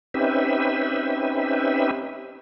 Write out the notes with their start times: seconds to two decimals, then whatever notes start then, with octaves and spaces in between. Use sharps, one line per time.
0.14 C4 C#4 D#4 G4 B4 E5